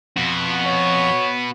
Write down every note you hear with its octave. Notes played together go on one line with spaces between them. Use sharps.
F2 B3 F#4
C#5